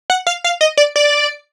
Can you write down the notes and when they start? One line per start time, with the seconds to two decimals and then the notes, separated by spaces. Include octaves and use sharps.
0.10 F#5
0.27 F5
0.44 F5
0.61 D#5
0.77 D5
0.96 D5